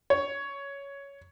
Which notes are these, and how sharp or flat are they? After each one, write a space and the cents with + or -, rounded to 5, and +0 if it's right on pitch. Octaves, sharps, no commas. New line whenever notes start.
C#5 +10